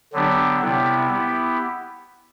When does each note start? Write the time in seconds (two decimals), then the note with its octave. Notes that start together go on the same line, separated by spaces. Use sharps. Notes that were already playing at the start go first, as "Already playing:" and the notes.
0.13 D3 F#3 B3 D4 G4
0.61 C3 G3 B3 E4
1.10 B3 E4 G4